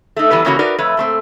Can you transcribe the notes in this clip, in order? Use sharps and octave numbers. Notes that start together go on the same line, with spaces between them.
A3 D#4
E3 G3 B3 B4
C#3 E3 A#3 C#4 F4 F#4
D#4 F#4 A#4 B4 D5
F2 A3 B4 C#5
A#2 A3 C4